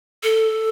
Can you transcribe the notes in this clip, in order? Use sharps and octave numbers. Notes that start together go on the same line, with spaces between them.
A4